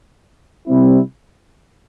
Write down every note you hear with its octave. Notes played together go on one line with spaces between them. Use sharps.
C3 G3 C4 E4